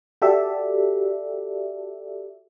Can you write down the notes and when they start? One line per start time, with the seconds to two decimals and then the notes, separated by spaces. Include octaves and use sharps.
0.22 F#4 G4 A4 D5 E5